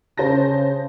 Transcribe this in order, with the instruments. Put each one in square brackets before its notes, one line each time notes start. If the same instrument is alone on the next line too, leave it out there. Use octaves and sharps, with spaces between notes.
[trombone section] C#3 [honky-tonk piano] C5 A5 A#6